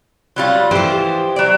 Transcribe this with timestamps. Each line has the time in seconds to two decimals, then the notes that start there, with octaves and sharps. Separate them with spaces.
0.36 F#3 G3 F4
0.71 E3 F3 G4 C5
1.36 F#3 D5